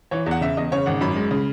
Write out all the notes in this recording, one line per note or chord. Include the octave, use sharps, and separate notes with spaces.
E3 C#5
E2 F#5
C#3 E5
E2 D#5
C#3 C#5
G#1 F#5
F#2 B5
G#3
C#3